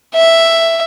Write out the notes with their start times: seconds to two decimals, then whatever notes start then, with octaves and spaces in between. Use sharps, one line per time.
0.15 E5